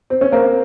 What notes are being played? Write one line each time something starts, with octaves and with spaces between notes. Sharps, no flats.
C4
C#4
A#3 C4